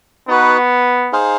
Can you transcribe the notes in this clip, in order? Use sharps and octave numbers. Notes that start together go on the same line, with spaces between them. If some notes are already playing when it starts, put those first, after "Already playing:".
B3 D#4 F#4 B4
D#4 G#4 C5 F5